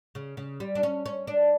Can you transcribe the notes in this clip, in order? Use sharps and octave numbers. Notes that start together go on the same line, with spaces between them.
C#3
C#3
G3
D4
C#4
C#4
D4